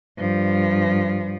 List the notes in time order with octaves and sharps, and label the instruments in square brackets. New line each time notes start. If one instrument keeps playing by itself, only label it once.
[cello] G2 F3